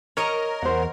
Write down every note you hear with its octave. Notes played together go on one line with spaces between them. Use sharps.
A#4 C#5 D#5 A#5
E2 C5 F#5